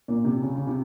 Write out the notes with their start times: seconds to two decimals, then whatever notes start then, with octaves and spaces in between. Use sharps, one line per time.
0.08 A#2
0.24 C3
0.42 C#3
0.55 C#3
0.67 C3